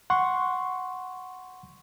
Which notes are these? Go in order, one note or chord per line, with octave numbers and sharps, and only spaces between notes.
F#5 C6 C#6